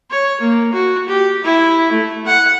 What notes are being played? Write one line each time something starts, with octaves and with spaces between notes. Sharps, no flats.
C#5
A#3
F#4
G4
E4
A3
F#5